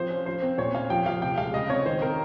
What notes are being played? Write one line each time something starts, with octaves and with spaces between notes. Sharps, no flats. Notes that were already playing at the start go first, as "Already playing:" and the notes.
Already playing: F3 C4 C5
C#4
F3 C5
C4
A#2 C#5
C#4 F5
F3 G5
F3 F5
C3 G5
G#3 F5
C#3 D#5
C4 C#5
D#3 C5
C4 A#4